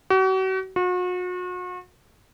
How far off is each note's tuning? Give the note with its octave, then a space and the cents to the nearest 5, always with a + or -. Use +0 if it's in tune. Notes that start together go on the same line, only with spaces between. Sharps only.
F#4 +40
F#4 -40